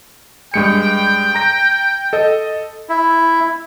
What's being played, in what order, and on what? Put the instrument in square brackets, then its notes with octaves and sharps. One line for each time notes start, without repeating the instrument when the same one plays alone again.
[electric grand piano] G2 G#3 C#7 [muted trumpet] G5
[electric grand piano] A#5 A#6 D7
A4 D#5
[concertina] E4